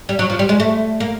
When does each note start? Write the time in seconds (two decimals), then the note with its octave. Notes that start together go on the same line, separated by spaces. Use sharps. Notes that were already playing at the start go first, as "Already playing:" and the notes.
0.09 G3
0.19 F#3
0.30 F3
0.39 G3
0.49 G#3
0.60 A3
1.00 A#3